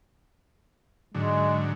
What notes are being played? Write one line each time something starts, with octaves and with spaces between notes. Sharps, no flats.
G#2 D3 F#3 G#3